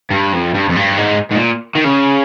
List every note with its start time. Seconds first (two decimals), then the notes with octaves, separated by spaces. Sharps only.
0.10 G2
0.33 F2
0.54 G2
0.69 F2
0.76 G2
0.98 G#2
1.31 G#2
1.36 A#2
1.75 D#3
1.84 C#3